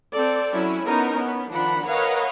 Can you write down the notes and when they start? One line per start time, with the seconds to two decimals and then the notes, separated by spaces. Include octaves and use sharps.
0.12 C4 A4 D5
0.53 F#3 C#4 E4
0.85 B3 C#4 D#4 A#4
1.17 B3 C#4
1.50 D#3 F3 D4 F4 F#5 B5
1.87 A#4 B4 C#5 D#5 F5 F#5